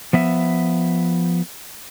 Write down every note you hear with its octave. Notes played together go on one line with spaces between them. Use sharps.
F3 B3 E5